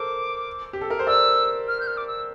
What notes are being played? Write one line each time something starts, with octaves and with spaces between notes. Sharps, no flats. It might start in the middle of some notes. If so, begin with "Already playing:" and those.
Already playing: A4 A#4 C5 D6
G4
A4
A#4
C5
A#4 D5 E6
F6
G6
F6
D6
E6